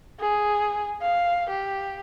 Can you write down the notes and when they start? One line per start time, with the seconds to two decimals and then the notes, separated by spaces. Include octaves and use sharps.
0.20 G#4
1.02 F5
1.50 G4